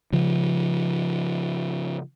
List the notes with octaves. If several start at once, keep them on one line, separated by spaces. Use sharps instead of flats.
C#3 F3